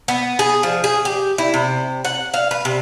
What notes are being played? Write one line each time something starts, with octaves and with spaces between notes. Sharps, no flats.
B3
G#4
F3
G#4
G4
E4
C3
F#5
F5
B4
C3